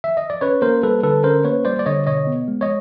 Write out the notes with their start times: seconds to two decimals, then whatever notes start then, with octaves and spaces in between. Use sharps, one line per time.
0.04 E5
0.17 D#5
0.30 D5
0.41 C#4 B4 C#5
0.62 A#3 A#4 C5
0.83 G3 A4 B4
1.03 D3 A4 B4
1.24 C#4 A#4 C5
1.45 A#3 B4 C#5
1.65 G3 C5 D5
1.79 D5
1.86 D3 C#5 D#5
2.07 B2 C#5 D#5
2.27 B3
2.48 G#3
2.61 C#5 D#5